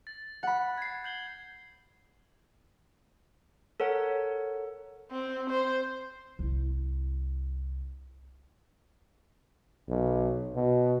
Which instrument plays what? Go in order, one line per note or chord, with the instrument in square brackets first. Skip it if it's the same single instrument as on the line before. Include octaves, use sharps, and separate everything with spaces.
[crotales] A6
[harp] F#5 B5
[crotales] G#6 C7
G6 F#7 G7
[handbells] A4 A#4 C#5 F#5
[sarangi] C4
C5
[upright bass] C2 E4
[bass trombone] B1
B2